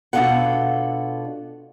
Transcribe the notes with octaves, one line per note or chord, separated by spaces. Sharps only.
B2 D4 D#4 F4 A4 F#5